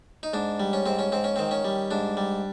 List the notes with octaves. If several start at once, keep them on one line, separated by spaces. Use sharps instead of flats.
D#4
G#2 D4
G3
C#4
G#2 C4
C#4
G#2 C4
C#4
D#3 C4
C#4
G3
G#2 D4
G3